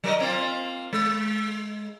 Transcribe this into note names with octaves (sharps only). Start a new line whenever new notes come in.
F#3 A#4 D#5
A#3 C4 F4
G#3